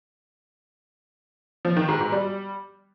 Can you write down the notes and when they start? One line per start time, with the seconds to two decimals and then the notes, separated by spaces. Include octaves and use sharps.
1.65 F3
1.77 D#3
1.88 G#2
2.00 G#2
2.12 G3